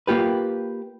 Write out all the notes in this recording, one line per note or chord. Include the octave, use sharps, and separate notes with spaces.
A#3 F4 G4 B4